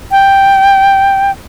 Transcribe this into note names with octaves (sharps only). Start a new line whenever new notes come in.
G5